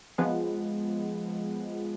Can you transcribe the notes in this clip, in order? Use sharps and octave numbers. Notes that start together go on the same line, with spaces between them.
F3 G#3 B3